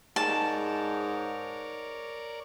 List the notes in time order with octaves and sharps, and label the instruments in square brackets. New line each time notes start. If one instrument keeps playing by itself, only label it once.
[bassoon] G#2 [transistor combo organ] A#4 C#5 D5 [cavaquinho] A5